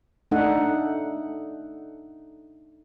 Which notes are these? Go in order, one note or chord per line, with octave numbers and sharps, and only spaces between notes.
A3 D4 D#4 A4 F#5